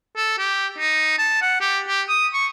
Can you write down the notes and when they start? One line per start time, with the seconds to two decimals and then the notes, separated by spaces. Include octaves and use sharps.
0.16 A4
0.38 G4
0.78 D#4
1.18 A5
1.41 F#5
1.60 G4
1.88 G4
2.08 D#6
2.33 C#6